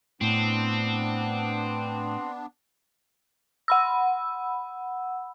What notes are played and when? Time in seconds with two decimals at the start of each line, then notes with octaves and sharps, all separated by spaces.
0.21 A2 B3 C4 D4
3.68 F#5 B5 E6